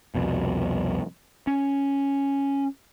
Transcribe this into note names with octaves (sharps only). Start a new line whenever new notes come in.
C2 F2 B2
C#4